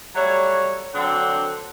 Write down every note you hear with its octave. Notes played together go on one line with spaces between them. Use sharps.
F#3 G3 A3 C#5
D3 F#3 C4 D4 F#5